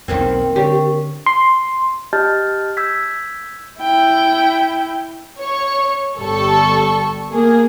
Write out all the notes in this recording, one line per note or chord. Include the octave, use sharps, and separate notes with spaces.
B1 E2 D#3 A#3 C4
D3 G4 C#5
C6
G4 D#5 A5 F6 G6 A6
E6 G6 G#6 B6
E4 G5
C#5 C#6
G1 G3 A4 C#6
A#3 G#4